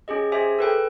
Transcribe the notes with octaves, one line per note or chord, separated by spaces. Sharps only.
C#4 G4 G#4 D#5
G4 G#4 C5 E5 G#5
A4 B4 G5